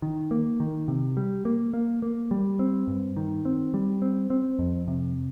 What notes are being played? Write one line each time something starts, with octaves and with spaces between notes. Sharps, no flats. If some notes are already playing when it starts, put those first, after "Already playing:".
D#3
A#3
D#3
C3
G3
A#3
A#3
A#3
G3
C4
G2
D#3
C4
G3
C4
C4
F2
C3